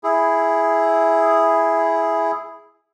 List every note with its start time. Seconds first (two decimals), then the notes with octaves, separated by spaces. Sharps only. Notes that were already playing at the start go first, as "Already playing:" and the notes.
0.04 E4 G#4